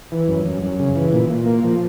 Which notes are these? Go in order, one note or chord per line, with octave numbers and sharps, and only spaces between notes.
E3
F#2
F#2
F#2
C#3
E3
A#2
A#2
A#3
F3